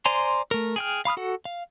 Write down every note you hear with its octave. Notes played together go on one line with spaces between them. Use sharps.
C5 D5 G#5 A#5 C6
A3 A#4
G#4 G5 F6
F5 B5 D#6 F6
F#4 A4 F#5
F5